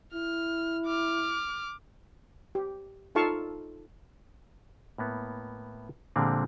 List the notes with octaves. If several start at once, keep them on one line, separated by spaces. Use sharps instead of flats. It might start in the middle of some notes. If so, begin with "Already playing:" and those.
E4 F6
D6 F6
G4
D#4 F4 A4 F5 A5 C#6
A2 A#3 B3
A#2 D3 F3 G3 G#3 C4